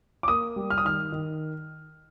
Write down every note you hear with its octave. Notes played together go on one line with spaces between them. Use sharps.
D6
A#3 D#6
G3
F6
D#6
D#3 F6
D#3